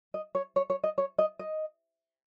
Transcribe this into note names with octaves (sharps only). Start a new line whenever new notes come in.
D#5
C#5
C#5
C#5
D#5
C#5
D#5
D#5